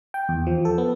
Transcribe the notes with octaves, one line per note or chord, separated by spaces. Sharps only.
G5
E2
F3
A4
B3